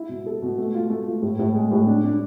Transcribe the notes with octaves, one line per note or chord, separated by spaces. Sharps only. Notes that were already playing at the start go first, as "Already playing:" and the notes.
Already playing: E4
B2
A4
B2
A3
F4
A3
F4
A2
A2
G#3
A2
D4
D4